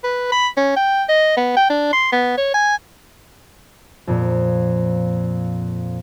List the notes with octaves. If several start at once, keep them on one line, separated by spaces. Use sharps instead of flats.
B4
B5
C#4
G5
D#5
B3
G5
D4
C6
B3
C#5
G#5
F2 A#2